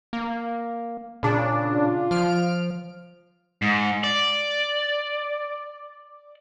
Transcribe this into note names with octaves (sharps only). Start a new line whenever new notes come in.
A#3
A#2 C#3 D4
F4
F3 F6 D7
G#2
D5